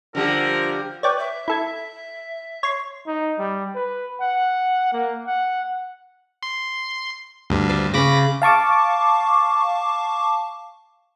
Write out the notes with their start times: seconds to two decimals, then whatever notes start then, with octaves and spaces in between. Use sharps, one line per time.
0.15 D3 F3 G3 A#4
1.03 B4 C#5 D5 G5
1.19 E5
1.48 E4 A4 G#6
2.63 C#5 C6
3.07 D#4
3.39 G3
3.75 B4
4.21 F#5
4.93 A#3
5.27 F#5
6.43 C6
7.50 D2 G2
7.69 C5 D5 E5
7.94 C#3 C#4 B5 D6 A#6
8.42 F5 A5 C#6 D6